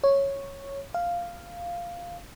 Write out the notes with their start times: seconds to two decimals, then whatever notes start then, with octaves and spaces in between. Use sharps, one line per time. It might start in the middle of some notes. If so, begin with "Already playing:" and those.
0.04 C#5
0.94 F5